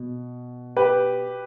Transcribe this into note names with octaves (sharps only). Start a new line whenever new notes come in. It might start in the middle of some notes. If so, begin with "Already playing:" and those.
Already playing: B2
G4 B4